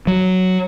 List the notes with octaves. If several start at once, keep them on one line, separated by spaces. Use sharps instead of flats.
F#3